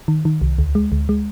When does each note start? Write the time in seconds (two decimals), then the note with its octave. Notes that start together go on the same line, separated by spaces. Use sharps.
0.08 D#3
0.25 D#3
0.42 C2
0.58 D2
0.75 G#3
0.92 D2
1.09 G#3